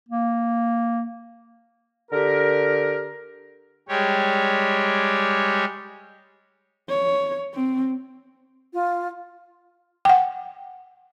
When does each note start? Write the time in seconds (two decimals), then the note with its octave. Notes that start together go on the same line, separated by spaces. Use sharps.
0.09 A#3
2.11 D3 G4 A#4
3.89 G3 G#3 G4 C#5
6.89 C#5
7.54 C4
8.73 F4
10.05 F#5 G5